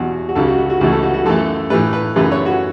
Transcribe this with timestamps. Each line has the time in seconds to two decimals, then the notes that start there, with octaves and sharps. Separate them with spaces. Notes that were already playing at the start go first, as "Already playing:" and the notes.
Already playing: E2 B2 F#3 F#4
0.29 F#4
0.35 C#2 C#3 F#3 A4
0.47 F#4
0.58 F#4
0.70 F#4
0.80 C#2 C#3 E3 A3 F#4
0.92 A4
1.03 F#4
1.14 F#4
1.25 F#2 E3 A3 A4
1.70 A2 E3 A3 B4
1.93 B4
2.16 F#2 C#3 E3 A3 B4
2.32 C#5
2.46 F#4